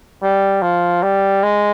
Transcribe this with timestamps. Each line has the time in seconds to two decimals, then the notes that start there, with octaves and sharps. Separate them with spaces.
0.23 G3
0.62 F3
1.03 G3
1.43 G#3